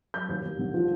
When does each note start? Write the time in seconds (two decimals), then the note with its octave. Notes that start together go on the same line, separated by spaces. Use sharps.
0.14 F#3 G6
0.29 D#2
0.44 D#2
0.59 D3
0.74 F3